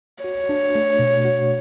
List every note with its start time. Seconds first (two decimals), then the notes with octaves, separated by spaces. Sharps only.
0.24 F#4 C#5
0.49 D4
0.75 A3
0.99 B2
1.25 F#4